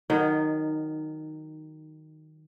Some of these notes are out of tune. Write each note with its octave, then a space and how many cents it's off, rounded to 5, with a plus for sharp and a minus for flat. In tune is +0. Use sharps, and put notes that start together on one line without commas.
D#3 +0 F#3 +0 D#4 -20